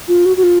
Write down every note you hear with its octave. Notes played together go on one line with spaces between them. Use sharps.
F4
F#4
F#4
F4